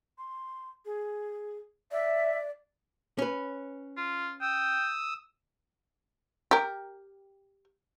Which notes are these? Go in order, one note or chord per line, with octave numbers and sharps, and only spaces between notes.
C6
G#4
D5 E5
C#4 B4
F4
G5 D#6 E6
G4 A#4